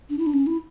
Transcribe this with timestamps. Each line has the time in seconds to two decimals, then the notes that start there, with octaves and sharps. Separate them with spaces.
0.10 D4
0.18 E4
0.26 D4
0.34 C#4
0.46 E4